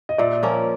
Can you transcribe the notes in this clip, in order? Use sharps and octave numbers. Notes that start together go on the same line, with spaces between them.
D#5
A#2 D5 E5
F3 A#3 C#4